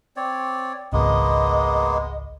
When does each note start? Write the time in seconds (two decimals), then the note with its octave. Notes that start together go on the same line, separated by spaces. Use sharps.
0.16 C4 C#5 D5
0.93 G#1 C#2 G#3 A#3 B3 D#5